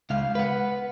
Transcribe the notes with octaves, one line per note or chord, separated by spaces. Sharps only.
C#2 F5
B4 F#5